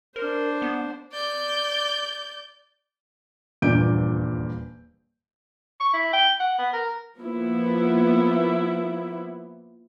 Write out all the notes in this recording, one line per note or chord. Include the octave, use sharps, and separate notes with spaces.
D4 A#4 C5
B3
D5 G6
D#1 E2 G2 A#2 G6 D7
C#6
E4
G5
F#5
B3
A#4
F3 A#3 B3 E4